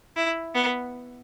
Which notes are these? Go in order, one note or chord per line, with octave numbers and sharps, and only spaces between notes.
E4
B3